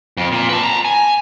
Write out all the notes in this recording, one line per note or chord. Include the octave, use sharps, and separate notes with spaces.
F2
A#2
B4 A5
A5 A#5
G#5